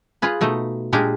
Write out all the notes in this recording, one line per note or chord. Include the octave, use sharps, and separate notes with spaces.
F4 G#4 B4
B2 A3 D#4 D#5
A#2 G#3 D4 G4 G#4 A#4